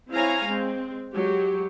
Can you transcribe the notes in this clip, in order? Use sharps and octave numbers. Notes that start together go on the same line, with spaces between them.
C4 E4 C#5 F5 G#5 A#5
G#3 C4
F#3 G#3 F#4 G4